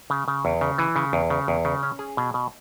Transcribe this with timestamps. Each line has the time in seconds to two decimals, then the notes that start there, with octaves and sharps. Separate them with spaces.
0.10 C#3
0.28 C#3
0.45 E2
0.61 C#3
0.78 E3
0.96 C#3
1.13 E2
1.30 C#3
1.48 E2
1.65 C#3
1.83 C#4
1.99 G#4
2.17 B2
2.34 B2